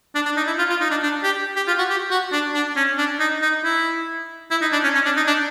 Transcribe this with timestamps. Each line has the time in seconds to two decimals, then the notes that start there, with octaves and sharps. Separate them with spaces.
0.15 D4
0.25 D4
0.36 D#4
0.47 E4
0.58 F4
0.70 F4
0.80 D#4
0.91 D4
1.02 D4
1.23 G4
1.56 G4
1.67 F4
1.78 F#4
1.89 G4
2.11 F#4
2.32 D4
2.54 D4
2.76 C#4
2.98 D4
3.20 D#4
3.42 D#4
3.64 E4
4.51 E4
4.61 D#4
4.72 D4
4.84 C#4
4.94 C#4
5.05 D4
5.16 D#4
5.27 D4